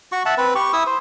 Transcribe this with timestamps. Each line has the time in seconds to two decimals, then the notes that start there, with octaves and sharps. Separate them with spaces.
0.12 F#4 C#6
0.26 E5 F#5 A5
0.38 C4 B4
0.55 G4 C#6
0.73 E4 D#6 E6
0.87 C5